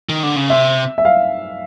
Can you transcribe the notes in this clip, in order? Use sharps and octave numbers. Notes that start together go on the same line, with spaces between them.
D#3
D3
C#3
C3 E5
E5
F5